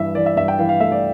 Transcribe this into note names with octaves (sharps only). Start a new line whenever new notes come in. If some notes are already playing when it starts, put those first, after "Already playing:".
Already playing: G2 E3 E5
E3 D5
E5
G2 E5
G5
E3 F5
F5
A3 E5
D5